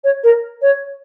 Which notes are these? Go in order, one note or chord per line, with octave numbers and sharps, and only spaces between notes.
C#5
A#4
C#5